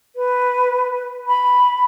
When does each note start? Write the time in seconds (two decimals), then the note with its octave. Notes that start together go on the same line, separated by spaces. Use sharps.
0.16 B4
1.27 B5